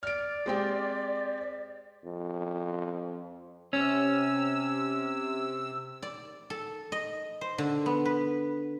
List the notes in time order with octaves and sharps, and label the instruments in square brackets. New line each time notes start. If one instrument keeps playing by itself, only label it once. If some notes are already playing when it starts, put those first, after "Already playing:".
[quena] D5 [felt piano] F6 D7
[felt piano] G#3 C4 G4
[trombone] F2
[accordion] C3 E6 [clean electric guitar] C#4
[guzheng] D5
A4
D#5
C5
D3
B3
B4